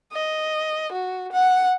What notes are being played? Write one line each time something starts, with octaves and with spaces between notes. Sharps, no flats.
D#5
F#4
F#5